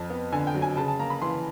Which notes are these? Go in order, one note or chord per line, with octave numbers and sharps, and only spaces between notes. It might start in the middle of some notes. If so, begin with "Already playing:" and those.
Already playing: F2 C4 A5
B3
D3 G#5
G5
F#3
G#5
C#3 A5
A5
A#3 A#5
B5
E3 C6